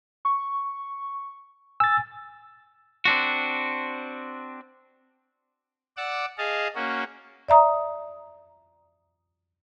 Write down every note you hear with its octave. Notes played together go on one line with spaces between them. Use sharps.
C#6
G#5 E6 A6
C4 D4 F#4
D5 F#5 D6 E6
G#4 D#5 F5 A5
A#3 C#4 F#4
D5 E5 A#5 D#6